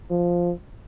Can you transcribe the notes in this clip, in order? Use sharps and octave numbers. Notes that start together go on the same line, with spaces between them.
F3